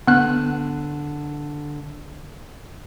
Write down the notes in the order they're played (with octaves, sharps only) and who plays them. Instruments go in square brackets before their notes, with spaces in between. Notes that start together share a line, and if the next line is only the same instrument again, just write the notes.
[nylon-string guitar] D3 [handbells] B3 F#6